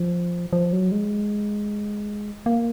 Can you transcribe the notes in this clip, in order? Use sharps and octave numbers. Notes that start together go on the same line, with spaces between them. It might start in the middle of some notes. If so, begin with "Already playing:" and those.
Already playing: F3
F3
F#3
G#3
A#3